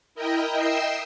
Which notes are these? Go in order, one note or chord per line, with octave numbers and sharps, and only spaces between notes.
E4 A#4 D#5 G5
D#5 E5 G5 E6 C7